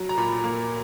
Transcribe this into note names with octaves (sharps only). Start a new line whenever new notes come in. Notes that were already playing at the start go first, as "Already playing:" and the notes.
Already playing: F#3
A#5
A#2 B5
A#3